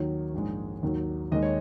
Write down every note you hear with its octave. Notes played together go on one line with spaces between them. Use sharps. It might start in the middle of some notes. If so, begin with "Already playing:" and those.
Already playing: D#2 D#3 F#3 C#5
A#1 G#2 G#3
D#2 D#3 F#3
D#2 D#3 G#3 D#5
C#5